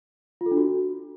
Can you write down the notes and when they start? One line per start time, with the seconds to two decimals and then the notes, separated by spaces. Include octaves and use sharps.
0.41 F4
0.46 A4
0.51 D4
0.57 F#4